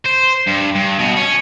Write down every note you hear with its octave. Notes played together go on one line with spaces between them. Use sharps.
C5
G2
G2
B2
C#4